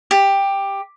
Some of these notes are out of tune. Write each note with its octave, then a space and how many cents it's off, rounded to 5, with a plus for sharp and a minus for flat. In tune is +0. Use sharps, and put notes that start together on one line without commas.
G4 +10